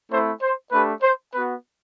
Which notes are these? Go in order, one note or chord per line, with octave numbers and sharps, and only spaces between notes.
A3 C4 E4 C5
C5
A3 D4 G4 B4
C5
B3 F#4 B4